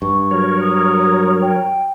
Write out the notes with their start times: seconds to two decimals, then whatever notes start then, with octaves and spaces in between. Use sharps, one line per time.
0.02 G2 C#6
0.31 F#3 A#4 C#5
0.60 D#6
1.42 G5